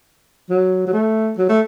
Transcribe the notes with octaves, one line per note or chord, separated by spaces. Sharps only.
F#3
F#3
A3
F#3
A3